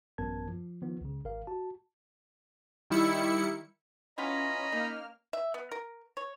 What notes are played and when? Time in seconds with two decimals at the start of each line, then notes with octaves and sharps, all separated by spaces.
0.18 A1 F#2 B3 A#4 A5 G#6
0.48 F3
0.82 D#3 F3 B3
1.01 C#2 C#3
1.25 G#1 A#4 F5
1.47 F#4 A5
2.90 D#3 G3 E4 C#7
4.18 E3 B3 C#4 F4 D#5 A#5 B5
4.72 A#3 D#4 F6
5.33 E5
5.54 B3
5.71 A#4
6.17 C#5